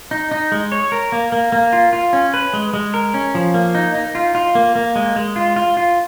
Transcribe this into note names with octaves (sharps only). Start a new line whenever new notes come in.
D#4
D#4
G#3
C#5
A#4
A#3
A#3
A#3
F4
F4
C#4
B4
G#3
G#3
A#4
C#4
F3
A#3
D#4
D#4
F4
F4
A#3
A#3
G#3
G#3
F4
F4
F4